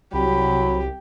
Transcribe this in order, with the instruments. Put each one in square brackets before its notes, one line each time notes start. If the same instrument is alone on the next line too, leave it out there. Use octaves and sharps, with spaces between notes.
[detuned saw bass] C2 [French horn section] F#3 [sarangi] G4 [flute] B5